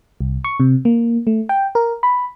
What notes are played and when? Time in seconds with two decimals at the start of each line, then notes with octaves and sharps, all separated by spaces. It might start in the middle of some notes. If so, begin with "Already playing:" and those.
0.21 C2
0.44 C#6
0.60 C3
0.85 A#3
1.27 A3
1.49 G5
1.75 A#4
2.03 B5